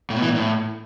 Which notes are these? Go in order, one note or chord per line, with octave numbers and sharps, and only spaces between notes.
A2
B2
E3
A#2
A2